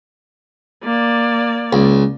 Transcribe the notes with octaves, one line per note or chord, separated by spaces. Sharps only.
A#3 D5
C#2